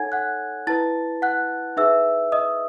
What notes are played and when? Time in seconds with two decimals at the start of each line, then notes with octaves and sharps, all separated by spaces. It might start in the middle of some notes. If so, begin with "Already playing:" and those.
Already playing: D#4 A4 C#5 F#5 G#5 G#6
0.12 F#5 F#6
0.67 E4 B4 A5 A6
1.22 F#5 F#6
1.77 D#4 G#4 B4 E5 E6
2.32 D#5 D#6